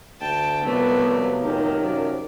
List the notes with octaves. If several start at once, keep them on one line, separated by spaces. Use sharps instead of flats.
D2 G5 A5
C2 C3 F3 F#3 A3 B3 D5
F1 D#3 G4
F#2 D5